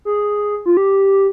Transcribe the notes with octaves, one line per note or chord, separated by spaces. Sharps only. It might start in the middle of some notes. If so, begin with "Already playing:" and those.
G#4
F4
G4